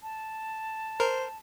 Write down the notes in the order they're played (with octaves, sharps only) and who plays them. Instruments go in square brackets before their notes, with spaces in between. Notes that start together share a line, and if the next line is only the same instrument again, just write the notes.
[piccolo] A5
[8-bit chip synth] A#4 [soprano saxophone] C5